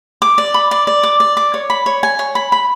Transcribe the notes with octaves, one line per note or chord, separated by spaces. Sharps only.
D6
D5
B5
D5
D5
D6
D5
D6
C#5
B5
C#5
G#5
C#5
B5
B5